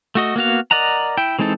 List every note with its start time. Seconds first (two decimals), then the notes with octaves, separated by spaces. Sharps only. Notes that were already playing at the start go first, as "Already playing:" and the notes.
0.15 A3 F#4 D#5
0.36 A#3 B3 F#4 F5
0.71 A#4 D5 D#5 F#5 A#5
1.17 E4 G5
1.39 E3 G#3 C4 D#4 A4